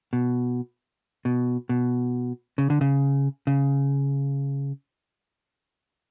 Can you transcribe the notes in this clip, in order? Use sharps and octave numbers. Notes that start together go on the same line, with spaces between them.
B2
B2
B2
C#3
D3
C#3
C#3